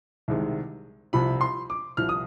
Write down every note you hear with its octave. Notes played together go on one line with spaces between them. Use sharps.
C2 C3 D#3 G#3
C2 C3 F3 B5
C6
D6
C2 C3 F3 F6
D#6